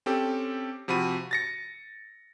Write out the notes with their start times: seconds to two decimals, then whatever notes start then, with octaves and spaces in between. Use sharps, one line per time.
0.06 C4 C#4 G4 A4
0.88 C3 F3 F#4 B5 D#7
1.31 A6 A#6 C#7